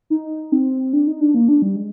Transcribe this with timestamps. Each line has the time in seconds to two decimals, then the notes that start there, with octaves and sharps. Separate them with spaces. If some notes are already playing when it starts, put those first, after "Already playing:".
0.10 D#4
0.52 C4
0.93 D4
1.07 D#4
1.21 D4
1.35 A#3
1.48 D4
1.62 G3
1.76 G#3